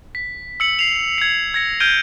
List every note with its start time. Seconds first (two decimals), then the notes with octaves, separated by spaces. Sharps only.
0.15 B6
0.60 E6 C#7 F#7
0.79 C7 F7
1.18 G#6 C#7
1.54 G#6 A#6 C#7
1.80 F6 G6 G#6 D7 D#7 G7